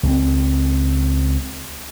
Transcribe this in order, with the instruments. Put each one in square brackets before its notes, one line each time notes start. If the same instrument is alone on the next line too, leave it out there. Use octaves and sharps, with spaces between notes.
[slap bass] C#2 G#3 C4